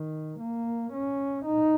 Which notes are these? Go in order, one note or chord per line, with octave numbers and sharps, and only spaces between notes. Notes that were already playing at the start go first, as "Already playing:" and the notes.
Already playing: D#3
A#3
C#4
D#4